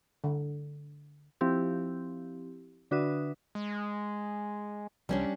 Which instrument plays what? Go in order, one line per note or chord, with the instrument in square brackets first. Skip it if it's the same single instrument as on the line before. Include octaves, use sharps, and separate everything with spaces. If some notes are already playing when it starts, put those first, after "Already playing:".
[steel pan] D3
[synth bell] F3 C4 E4 G4
D3 D4 F#4 B4 E5 D#6
[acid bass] G#3
[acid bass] C2 [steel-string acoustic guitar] G3 C#4 D4